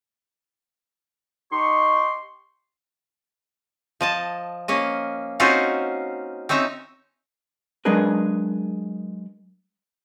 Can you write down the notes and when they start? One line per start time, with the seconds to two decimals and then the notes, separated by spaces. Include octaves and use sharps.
1.52 D#4 G4 C6 C#6
4.01 F3 D#5 A5
4.68 A#3 C#4 D#5
5.40 C4 C#4 D#4 F4 F#4 C5
6.49 C4 C#4 D#4 E5 A#5
7.85 F#3 G#3 D4 G#4 A#4 B4